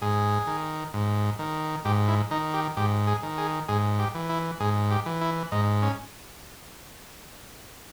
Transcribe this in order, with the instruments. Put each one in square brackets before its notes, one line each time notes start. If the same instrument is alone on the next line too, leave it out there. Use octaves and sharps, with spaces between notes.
[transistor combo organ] G#2 G#4
D#3
G#2
D#3
G#2 G4
E4
D#3 D#4
G4
G#2 G4
G#4
D#3
G#4
G#2 G#4
G4
E3
E4
G#2 G#4
G4
E3
E4
G#2 D#4
C#4